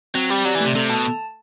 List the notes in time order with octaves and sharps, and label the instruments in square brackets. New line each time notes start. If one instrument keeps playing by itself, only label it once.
[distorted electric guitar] F#3 [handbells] C4
[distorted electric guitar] G3 [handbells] G4
[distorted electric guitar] F#3 [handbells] D5
[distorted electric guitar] E3
[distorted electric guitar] C3 [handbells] A3
[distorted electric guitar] C3 [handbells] A4
[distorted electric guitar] B2 [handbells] A5